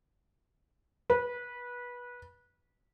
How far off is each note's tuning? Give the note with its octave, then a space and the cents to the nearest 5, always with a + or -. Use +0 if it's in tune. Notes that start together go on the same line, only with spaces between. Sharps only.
B4 -20